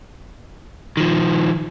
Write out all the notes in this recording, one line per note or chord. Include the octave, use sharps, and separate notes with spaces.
D#3 F3